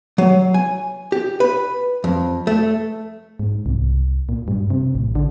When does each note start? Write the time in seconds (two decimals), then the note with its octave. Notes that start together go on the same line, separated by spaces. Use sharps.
0.18 F#3
0.54 G#5
1.12 G4
1.40 B4
2.04 F2
2.47 A3
3.39 G#2
3.66 C2
4.29 A#2
4.48 G2
4.70 C3
4.95 A1
5.15 D3